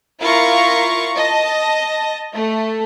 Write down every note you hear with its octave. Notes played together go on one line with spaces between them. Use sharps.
E4 F4 A#4 F5 A#5 C#6
D#5 A5
A3